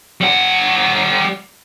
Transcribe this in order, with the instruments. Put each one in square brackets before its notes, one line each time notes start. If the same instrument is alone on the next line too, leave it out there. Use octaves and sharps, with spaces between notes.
[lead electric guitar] G3 F#5